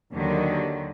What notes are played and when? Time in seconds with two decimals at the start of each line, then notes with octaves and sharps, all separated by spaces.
0.13 D#2 D3 D#3 F#3